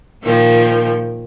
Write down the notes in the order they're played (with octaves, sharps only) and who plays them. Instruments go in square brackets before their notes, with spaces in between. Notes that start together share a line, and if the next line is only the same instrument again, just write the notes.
[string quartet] A#2 D#3 F3 G5